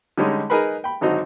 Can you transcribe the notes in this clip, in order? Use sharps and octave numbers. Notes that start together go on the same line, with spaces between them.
D3 G3 G#3 C#4 D#4
D#4 G#4 A#4 B4 B5
G5 B5
G#1 D3 F#3 D#4 F#4 C5